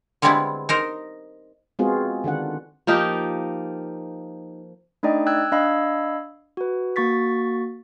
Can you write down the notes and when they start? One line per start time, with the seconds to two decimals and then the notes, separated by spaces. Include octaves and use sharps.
0.22 D3 G3 G#3 B3 C4 E4
0.69 D#4 A#4 C5
1.79 G#3 B3 C4 F4 F#4 G#4
2.24 D3 D#3 D4 F#5
2.87 F3 A#3 D#4 G4
5.03 A3 D4 D#4 D5 D#5 G5
5.26 G5 E6 F#6 G#6
5.52 D4 D#5 F5 B5 E6 G#6
6.57 F#4 B4
6.96 A#3 F#4 C#6 A6 B6